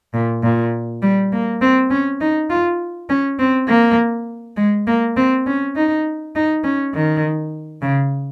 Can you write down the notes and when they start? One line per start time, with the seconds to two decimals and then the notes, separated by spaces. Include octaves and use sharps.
0.14 A#2
0.43 A#2
1.03 G3
1.32 A#3
1.61 C4
1.90 C#4
2.20 D#4
2.50 F4
3.09 C#4
3.39 C4
3.68 A#3
4.57 G#3
4.87 A#3
5.17 C4
5.46 C#4
5.76 D#4
6.35 D#4
6.64 C#4
6.94 D#3
7.82 C#3